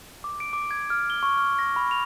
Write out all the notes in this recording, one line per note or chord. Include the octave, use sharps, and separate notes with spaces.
D6
D7
D6
G#6
F6
G7
C#6
F6
A#6
B5
F7